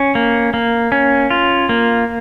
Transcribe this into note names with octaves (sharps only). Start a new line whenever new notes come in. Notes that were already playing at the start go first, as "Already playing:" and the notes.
Already playing: C#4
A#3
A#3
C#4
F4
A#3